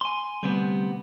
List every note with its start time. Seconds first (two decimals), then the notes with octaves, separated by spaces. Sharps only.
0.01 G#5 C6
0.43 D2 C3 G3 B3